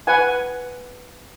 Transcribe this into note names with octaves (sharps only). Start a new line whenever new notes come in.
B4 F#5 G#5